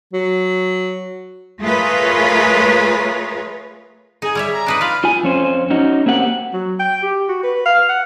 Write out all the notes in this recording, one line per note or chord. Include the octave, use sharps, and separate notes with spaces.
F#3
A3 F4 G#4 A#4 B4 C#5
D#4 G#4
G3 C#5 E5
A#5
D4 D#4 B4
F4 B4 F5 B5
F4 G#5
F2 C#4 C5
C#4 D#4 F#4
A#3 C4 G4 F#5
F#3
G5
G4
F#4
B4
F5
F#5